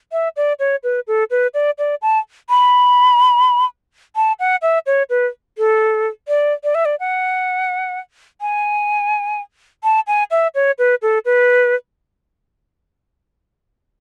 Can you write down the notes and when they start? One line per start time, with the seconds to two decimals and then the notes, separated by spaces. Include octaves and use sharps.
0.12 E5
0.37 D5
0.59 C#5
0.84 B4
1.07 A4
1.31 B4
1.54 D5
1.78 D5
2.02 A5
2.50 B5
4.16 A5
4.40 F#5
4.62 E5
4.86 C#5
5.10 B4
5.58 A4
6.28 D5
6.64 D5
6.75 E5
6.85 D5
7.00 F#5
8.41 G#5
9.84 A5
10.07 G#5
10.31 E5
10.55 C#5
10.79 B4
11.02 A4
11.25 B4